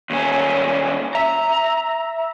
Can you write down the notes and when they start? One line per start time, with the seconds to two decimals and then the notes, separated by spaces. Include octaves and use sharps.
0.10 D#2 C#4
1.15 E5 A#5